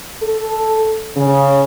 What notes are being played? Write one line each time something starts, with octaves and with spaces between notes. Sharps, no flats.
A4
C#3